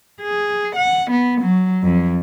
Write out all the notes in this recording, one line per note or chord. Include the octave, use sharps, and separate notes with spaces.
G#4
F#5
B3
F#3
F2